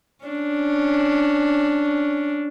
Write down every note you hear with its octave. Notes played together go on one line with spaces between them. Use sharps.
C#4 D4